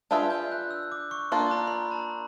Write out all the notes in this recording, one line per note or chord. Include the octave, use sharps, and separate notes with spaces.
D4 F4 G#4 B4 E5 G6
G6
F#6
E6
D6
C#6
A#3 D4 F4 C6
A#5
B5
A#5
A5